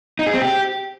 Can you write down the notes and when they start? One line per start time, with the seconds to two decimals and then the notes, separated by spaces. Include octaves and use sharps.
0.19 D#4
0.27 G#4
0.34 C4
0.42 G4